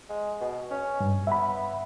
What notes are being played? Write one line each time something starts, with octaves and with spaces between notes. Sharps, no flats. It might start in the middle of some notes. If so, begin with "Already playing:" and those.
G#3
B2
C#4
G2
B3 E5 B5